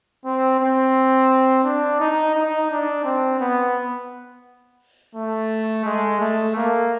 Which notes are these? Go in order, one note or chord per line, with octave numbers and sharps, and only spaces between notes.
C4
C4
D4
D#4
D#4
D4
C4
B3
A3
G#3
A3
A#3